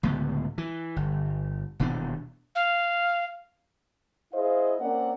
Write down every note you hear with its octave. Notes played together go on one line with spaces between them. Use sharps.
C#2 A2 D3 B3
E3
G1
D#1 B2 E3 D4
F5
E4 G#4 C5 D#5 F5
A#3 C4 C#4 A#4 D5 F#5